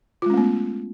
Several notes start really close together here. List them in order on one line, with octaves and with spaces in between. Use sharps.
F4 G#3 C#4 A3 B3